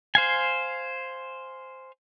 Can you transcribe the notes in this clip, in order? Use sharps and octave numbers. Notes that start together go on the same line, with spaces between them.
C5 F5 G#5